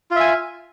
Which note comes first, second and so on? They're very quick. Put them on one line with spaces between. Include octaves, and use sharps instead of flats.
F4 E5 G#5